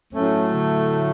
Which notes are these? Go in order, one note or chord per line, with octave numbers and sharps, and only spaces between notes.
A2 F#3 A3 C#4
D3